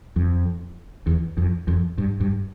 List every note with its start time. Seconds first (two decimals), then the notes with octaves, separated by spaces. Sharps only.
0.16 F2
1.07 E2
1.37 F2
1.68 F2
1.98 G2
2.20 G2